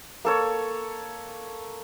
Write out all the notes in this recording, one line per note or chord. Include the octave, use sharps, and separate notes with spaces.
A#3 A4 C#5